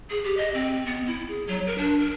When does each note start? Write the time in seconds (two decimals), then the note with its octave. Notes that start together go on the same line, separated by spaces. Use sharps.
0.10 G#4
0.24 G4
0.37 D#5
0.54 C4
0.86 B3
1.07 E4
1.28 G#4
1.48 F#3
1.67 A#4
1.78 D4
1.99 A#4